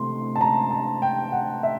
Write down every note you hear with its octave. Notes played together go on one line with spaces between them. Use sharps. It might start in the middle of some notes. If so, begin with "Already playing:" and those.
Already playing: C3 E3 A3 C6
A5
A#5
A5
G5
F#5
E5